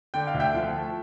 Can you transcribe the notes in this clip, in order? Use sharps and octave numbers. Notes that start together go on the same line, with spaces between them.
D3 G5
F5
D2
E5 G5
F3
A3